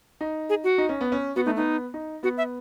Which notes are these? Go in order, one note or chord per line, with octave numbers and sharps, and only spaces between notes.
D#4
G#4
F#4
D#4
C#4
B3
C#4
B3 F#4
A3 D#4
B3 D#4
D#4
B3 F#4
E5